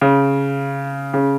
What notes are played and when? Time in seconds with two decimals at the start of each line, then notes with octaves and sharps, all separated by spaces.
0.01 C#3
1.14 C#3